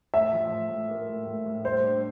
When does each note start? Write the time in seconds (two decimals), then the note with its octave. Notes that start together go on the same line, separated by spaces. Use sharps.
0.14 A2 E5
0.33 F3
0.51 A2
0.70 A2
0.89 A#3
1.08 A2
1.27 A2
1.46 A2
1.65 G3 C5
1.83 D4